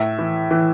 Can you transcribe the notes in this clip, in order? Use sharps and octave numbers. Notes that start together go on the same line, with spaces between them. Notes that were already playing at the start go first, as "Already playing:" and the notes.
Already playing: A2 E5
E3
E3